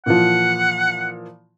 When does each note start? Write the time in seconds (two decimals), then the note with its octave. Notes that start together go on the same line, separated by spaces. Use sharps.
0.06 A#2 E3 F3 F#5